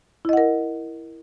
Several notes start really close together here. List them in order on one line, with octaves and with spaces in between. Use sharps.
E4 D#5 F#5 A#4